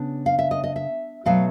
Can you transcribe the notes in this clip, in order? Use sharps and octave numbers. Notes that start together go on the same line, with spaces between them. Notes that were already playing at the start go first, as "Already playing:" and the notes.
Already playing: C#3 B3 D4
F5
E5
D#5
D#5
E5
B2 F#3 A3 F5